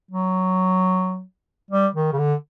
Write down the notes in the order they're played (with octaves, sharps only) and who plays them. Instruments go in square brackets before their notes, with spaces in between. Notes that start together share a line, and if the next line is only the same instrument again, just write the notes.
[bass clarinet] F#3
G3
D#3
C#3
D3